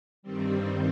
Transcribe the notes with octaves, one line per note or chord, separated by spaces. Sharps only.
G2 D#3 G3 C4